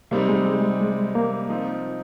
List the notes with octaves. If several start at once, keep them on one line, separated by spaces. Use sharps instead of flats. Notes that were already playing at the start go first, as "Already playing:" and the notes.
C3 G3 A#3 C4 D#4
G#3
G#3
G#3
A#3
F3 C4 D#4